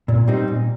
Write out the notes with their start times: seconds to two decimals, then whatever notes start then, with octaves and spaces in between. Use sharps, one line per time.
0.08 A#2
0.28 G3 C4 D#4
0.48 A#2